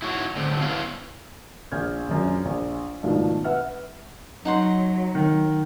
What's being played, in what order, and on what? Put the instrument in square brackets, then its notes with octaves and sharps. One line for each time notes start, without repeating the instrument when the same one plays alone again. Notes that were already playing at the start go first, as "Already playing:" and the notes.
[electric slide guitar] E4 F#4 C#5
A2 D3 C4
B3 E4 C#5 F5
[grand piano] A#1 F6 G6 G#6
A#1 F#2
A#1
G#2 B2 D#3 F3 A3 D4
B4 E5 F#5 F6
[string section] F#3 [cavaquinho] D#4 F#5 C6
[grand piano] D#3